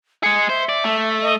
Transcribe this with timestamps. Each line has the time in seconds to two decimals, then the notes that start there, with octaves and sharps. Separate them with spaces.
0.23 G#3 G#4 C#7
0.49 C5 E5
0.69 D5
0.84 A3
1.22 D#5